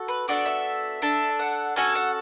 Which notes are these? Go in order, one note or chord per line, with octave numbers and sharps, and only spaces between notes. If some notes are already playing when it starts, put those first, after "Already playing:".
Already playing: F#4 A4
B4
B3 D4 F#4 A4 D5
E5
D4 A4
F#5
C#4 F#4 A4 G#5
F#5